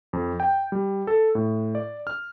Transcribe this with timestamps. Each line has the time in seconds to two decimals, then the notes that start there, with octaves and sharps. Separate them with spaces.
0.13 F2
0.40 G5
0.72 G3
1.07 A4
1.35 A2
1.75 D5
2.07 F6